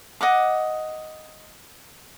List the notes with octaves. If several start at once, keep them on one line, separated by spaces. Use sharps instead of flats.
D#5 F#5 D6